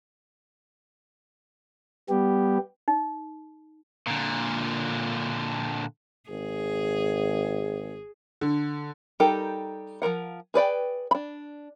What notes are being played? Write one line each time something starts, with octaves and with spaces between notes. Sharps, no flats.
G3 B3 G4
D#4
A#2 D3
G#1 G#4
D3
G3 D#4 G4 A4 A#4
F3 F#3 A#4 F#5
G#4 B4 D5 G5
D4 B5